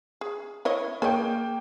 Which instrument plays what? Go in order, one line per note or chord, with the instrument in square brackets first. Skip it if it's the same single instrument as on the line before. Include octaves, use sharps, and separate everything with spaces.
[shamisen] G#4
E4 C#5 D#5
[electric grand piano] A#3 G5 [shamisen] G#4 C#5 D#5